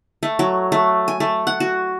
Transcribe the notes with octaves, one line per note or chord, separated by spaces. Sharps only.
A3
F#3
A3
G#5
A3
F#5
F#4